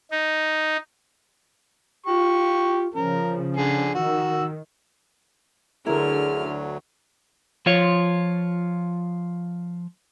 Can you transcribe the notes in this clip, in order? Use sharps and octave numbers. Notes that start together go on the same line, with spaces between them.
D#4
F4 G4 C#6
C#3 F3 C#4 A#4
D3 G#4
D#3 F#4 E6
D2 D3 F#3 E4 G#4 A#4 F6
F3 F4 C#5